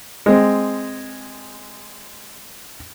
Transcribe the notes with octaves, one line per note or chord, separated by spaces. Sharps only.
G#3 C4